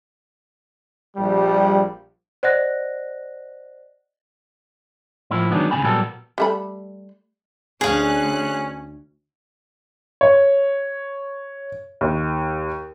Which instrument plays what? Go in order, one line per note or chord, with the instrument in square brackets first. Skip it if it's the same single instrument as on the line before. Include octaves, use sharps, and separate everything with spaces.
[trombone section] A#1 G3
[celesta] C5 D5 D#5 F#5 F#6 A#6
[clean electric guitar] A2 F3 A#3 E4
D#3 F#3 G#3 B3 D4
D2 C#3 B3 D4 G#5 B5
A#2 F#3 G3 A#3 B3 A4
[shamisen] G3 A3 B5
[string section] D2 F#6 [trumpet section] C#4 [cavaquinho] G#4 F5
[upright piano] C#5
D#2